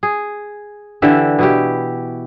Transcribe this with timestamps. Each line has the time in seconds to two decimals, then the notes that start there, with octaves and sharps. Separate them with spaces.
0.03 G#4
1.02 D3 E3 G4 E5
1.39 B2 E4 G4